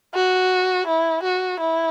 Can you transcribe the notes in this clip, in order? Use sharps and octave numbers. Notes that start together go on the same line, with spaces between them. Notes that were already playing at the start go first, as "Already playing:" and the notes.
F#4
E4
F#4
E4